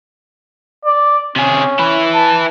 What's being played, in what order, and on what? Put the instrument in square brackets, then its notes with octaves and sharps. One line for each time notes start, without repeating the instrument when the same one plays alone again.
[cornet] D5
[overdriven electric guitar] C3 G#4 [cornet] C#4
[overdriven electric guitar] E4 B4
[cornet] A5